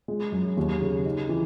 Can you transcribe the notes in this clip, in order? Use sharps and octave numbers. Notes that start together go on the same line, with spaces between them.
G#3
F#2
D#2
C#3
D#4
E3